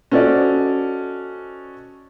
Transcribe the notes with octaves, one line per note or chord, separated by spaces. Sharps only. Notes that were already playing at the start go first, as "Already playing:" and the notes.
C#4 F#4 A4 C5 D5 D#5